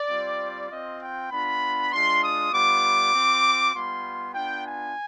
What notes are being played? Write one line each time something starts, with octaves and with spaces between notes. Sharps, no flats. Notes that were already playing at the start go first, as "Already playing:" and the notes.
Already playing: D5
G3 C4 F4
C4 F4 D#5
G5
B3 D4 F4 B5
G#3 D4 F4 C6
D#6
G3 B3 F4 D6
C4 F4
G3 B3 F4 C6
B3 D4 F4 G5
G#5